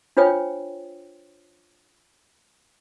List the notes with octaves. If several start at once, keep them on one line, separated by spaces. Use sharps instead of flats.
D4 F4 C5 C#5 G5